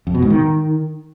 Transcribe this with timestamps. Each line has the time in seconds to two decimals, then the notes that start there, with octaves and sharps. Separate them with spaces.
0.07 F2
0.15 B2
0.22 G#2
0.30 D#3